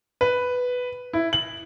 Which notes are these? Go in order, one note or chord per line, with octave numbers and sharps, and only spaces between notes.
B4
E4
F#7